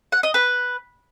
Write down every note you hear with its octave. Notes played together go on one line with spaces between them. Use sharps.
F#5
D#5
B4